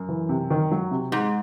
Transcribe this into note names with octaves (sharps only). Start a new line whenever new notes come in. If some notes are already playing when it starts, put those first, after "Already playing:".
Already playing: F#2
E3
C3
D#3
F#3
C3
G#2 G#3